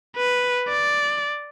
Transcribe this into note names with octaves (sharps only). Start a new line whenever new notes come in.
B4
D5